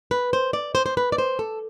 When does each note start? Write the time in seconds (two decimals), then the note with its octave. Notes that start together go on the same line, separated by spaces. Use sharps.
0.11 B4
0.33 C5
0.53 D5
0.75 C5
0.86 C5
0.97 B4
1.12 D5
1.18 C5
1.39 A4